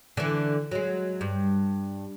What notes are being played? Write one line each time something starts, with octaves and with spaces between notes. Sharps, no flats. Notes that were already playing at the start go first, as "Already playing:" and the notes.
D3 E3
F#3 G#3
G2